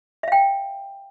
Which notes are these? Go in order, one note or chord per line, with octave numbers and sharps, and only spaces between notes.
E5 F5 G5